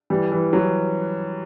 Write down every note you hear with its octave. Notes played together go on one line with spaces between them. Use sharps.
E3 G3
E3
F#3